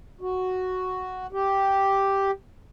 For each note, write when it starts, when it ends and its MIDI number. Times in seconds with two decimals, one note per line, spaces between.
0.21 1.27 66
1.33 2.31 67